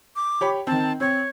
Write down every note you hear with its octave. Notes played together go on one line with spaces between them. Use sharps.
D6
G4 C#5 B5
D#3 C4 A5
C4 C#5